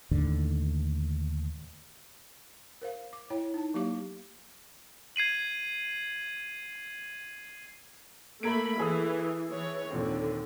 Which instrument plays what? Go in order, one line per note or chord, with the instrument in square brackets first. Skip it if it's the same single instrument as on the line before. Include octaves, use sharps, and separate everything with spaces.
[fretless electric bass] D#2 A2 D3
[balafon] A#4 C5 F5
D6
E4 C#5 G5
D#4 A5
F#3 A#3 G4 F5 D6
[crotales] G#6 C7 D#7 F#7
[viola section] A3 A#3 B5 [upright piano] A#5 G#6 D7
[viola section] E3 [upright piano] G#4 A4 D#6
[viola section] E3 C#5
[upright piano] D#2 A#2 C4 [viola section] D3